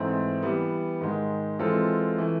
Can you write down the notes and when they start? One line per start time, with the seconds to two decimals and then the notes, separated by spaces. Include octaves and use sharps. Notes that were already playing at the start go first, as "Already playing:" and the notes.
Already playing: G#2 E3 A3 C4
0.43 E3 G3 B3
1.01 G#2 D#3 G#3
1.59 E3 G#3 C4 F4 A4
2.18 E3 A3